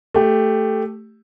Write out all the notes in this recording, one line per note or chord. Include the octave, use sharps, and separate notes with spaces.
A3 G4